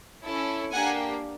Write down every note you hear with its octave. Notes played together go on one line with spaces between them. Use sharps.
C#4 E4 A4
A#3 D4 G4 F#5 G#5